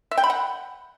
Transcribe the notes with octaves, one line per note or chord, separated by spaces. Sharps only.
E5
G5
B5
F#5